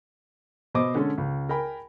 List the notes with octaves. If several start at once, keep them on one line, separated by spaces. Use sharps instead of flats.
B2 C5 D#5 D6 D#6
D3 G#3 C#4 A4
C#2
A#4 G5 G#5 B5